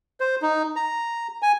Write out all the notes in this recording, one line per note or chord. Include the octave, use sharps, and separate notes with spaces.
C5
D#4
A#5
G#5